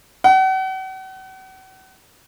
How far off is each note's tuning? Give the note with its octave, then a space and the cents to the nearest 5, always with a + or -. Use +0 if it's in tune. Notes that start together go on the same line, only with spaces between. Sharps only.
F#5 +40